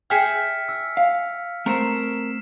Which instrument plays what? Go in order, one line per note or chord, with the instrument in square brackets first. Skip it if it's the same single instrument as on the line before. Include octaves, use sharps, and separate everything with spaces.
[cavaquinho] G#4 E5 G5 [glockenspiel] F6 B6 C#7
[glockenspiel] E6
[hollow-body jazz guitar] F5
[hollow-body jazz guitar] A3 C4 [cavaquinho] A#4 [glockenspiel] B6 C7 E7